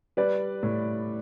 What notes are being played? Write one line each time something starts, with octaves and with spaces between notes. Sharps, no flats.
G3 B4 D5
A2